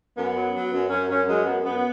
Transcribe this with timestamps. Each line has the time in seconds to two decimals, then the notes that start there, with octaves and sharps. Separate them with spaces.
0.16 F#2 B3
0.35 F#3
0.53 F#3
0.72 F#2
0.90 F#2 C#4
1.08 F#2 C#4
1.27 F#2 G#3
1.45 F#2 B3
1.64 F#2 B3